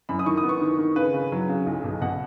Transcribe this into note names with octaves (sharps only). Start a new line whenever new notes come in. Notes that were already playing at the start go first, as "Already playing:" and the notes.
F#2 B5
D#6
D#3 C#6
D#6
B3
C#6
D#3
D#3
C#3 B4
C#3
F#3
C#3
B1
B2
B2 F#5